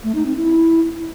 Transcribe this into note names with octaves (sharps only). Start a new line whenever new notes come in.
A3
D#4
C4
E4